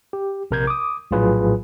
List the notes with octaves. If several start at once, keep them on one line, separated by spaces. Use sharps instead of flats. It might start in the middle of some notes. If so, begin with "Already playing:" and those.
G4
A#1 C3 A#4 A#5 G6 G#6
D6 D#6
A#1 A2 F#3 F4 G#4 B4